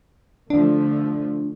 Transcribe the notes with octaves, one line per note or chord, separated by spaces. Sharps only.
D3 F3 A3 D4